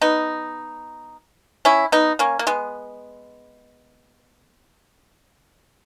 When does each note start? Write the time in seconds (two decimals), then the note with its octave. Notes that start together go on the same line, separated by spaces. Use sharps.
0.01 B3 D#4
1.65 C#4 E4
1.92 B3 D#4
2.19 A#3 C#4
2.39 A#3
2.47 G#3 B3